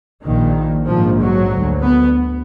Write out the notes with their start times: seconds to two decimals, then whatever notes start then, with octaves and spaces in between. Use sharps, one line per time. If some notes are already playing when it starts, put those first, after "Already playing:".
0.23 A#1 A#2 D#3
0.87 A#1 G#2 F3
1.19 F#3
1.51 D2
1.82 B3